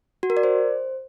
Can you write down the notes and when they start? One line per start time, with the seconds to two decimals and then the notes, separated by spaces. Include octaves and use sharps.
0.23 F#4
0.30 A#4
0.37 D5
0.43 C5